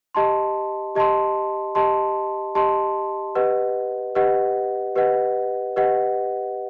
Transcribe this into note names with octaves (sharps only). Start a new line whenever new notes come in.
G4 D#5 A5 C6
G4 D#5 A5 C6
G4 D#5 A5 C6
G4 D#5 A5 C6
G4 B4 D#5 F#5
G4 B4 D#5 F#5
G4 B4 D#5 F#5
G4 B4 D#5 F#5